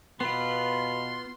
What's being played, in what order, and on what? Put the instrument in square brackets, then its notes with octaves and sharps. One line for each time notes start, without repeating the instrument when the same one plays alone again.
[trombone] B2 [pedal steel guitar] B3 F4 [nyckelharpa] B4 [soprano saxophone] C6